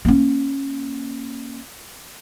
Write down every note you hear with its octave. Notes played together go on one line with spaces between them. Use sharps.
A#3 C#4